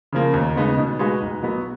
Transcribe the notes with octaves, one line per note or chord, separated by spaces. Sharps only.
C#3 F3 A#3
D#2
C#3 G#3 B3 D#4
B2
G#3 D#4 F#4 B4
B1
B2 F#3 B3 F#4